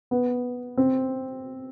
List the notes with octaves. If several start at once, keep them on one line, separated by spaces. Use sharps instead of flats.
B3
C4